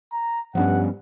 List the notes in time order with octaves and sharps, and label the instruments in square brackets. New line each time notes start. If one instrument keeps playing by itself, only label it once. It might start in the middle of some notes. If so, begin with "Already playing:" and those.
[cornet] A#5
[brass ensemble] G2 [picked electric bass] F3 B3 C#4 [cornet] F#5